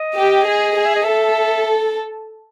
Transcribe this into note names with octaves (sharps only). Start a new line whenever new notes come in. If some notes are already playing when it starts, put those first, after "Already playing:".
Already playing: D#5
G4
G#4
G#4
E5
D#5
A4 E5